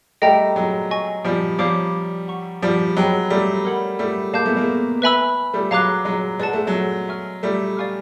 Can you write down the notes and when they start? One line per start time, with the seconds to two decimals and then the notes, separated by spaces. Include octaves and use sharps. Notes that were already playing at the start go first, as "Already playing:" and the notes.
0.22 G3 A3 D#5 G5 A#5
0.56 F#3 G#3
0.91 D#5 G#5 C#6
1.25 F3 G3
1.59 F3 G3 C#5 F5 A#5 D6
2.28 F#5 A#5 C#6
2.62 F3 G3
2.97 F#3 G#3 B4 D#5 G5 B5
3.30 G3 A3
3.65 A#4 C#5 F#5 B5
3.99 G3 A3
4.33 G#3 A#3 F5 A5 D6 G6
4.46 A3 B3
4.56 G#3 A#3
5.02 B4 E5 G#5 B5 E6
5.54 G3 A3
5.71 F#3 G#3 F5 A#5 D6 F#6
6.05 F#3 G#3
6.40 G#3 B4 D5 F#5 A5
6.53 A3
6.67 F#3 G#3
7.08 E5 G#5 C#6 F6
7.43 G3 A3
7.77 D5 F5 G#5 C#6 F6